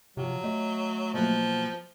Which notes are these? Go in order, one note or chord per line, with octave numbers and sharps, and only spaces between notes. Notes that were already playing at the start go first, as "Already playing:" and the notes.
C3 F3 F#3 F4 G4
A3 D#5
B2 F3 F#3 A#3